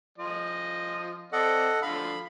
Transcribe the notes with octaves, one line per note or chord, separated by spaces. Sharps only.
F3 D#5
C4 A4 D5 D#5 F#5
D3 F3 F5 B5